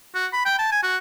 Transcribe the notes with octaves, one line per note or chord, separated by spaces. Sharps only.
F#4
B5
G5
A5
G#5
F#4